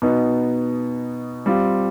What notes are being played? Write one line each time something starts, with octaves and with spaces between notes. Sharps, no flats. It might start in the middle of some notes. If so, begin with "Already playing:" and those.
B2 B3 D#4
G3 C4 F4